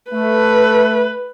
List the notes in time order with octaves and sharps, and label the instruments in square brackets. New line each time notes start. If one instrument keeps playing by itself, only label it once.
[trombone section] A3 [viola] B4